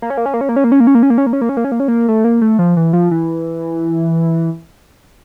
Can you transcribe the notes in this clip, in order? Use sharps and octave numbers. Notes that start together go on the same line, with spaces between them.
A#3
C#4
A#3
C#4
A#3
C#4
A#3
C#4
A#3
C#4
A#3
C#4
A#3
C#4
A#3
C#4
A#3
C#4
A#3
C#4
A#3
C#4
A#3
C#4
A#3
A3
A#3
A3
F3
E3
F3
E3